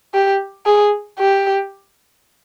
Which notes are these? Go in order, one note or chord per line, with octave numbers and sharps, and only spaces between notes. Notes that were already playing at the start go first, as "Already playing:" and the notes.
G4
G#4
G4